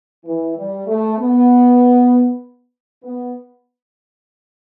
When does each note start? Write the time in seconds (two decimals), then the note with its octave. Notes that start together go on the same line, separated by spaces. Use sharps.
0.25 E3
0.56 G3
0.87 A3
1.18 B3
3.03 B3